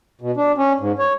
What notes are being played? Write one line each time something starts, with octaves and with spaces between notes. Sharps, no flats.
B2
D4
C#4
G#2
C#5